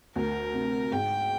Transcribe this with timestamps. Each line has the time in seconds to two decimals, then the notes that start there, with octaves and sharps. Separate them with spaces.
0.16 D2 A#4
0.54 C3
0.92 G#2 G5